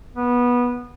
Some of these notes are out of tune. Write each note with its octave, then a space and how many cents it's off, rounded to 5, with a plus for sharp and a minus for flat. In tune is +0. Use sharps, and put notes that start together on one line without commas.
B3 -15